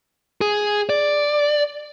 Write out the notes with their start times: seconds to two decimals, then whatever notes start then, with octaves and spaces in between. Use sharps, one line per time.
0.41 G#4
0.89 D5